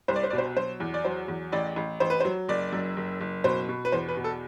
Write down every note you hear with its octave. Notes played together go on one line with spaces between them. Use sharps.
C2 C5
D5
C5
D5
B2
C5
F#3 C5
E2
D5
F#3 C5
E2
A1 D5
A1
A1 C5
B4
C5
F#3
F#1 D5
F#2
F#1
F#1
B2 C5
B2
B4
E2 C5
B4
B2
A4